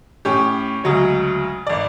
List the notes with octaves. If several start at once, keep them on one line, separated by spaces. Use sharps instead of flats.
A2 C#4 G4
D2 C#3 F#3 G#3 C#5
G#1 D5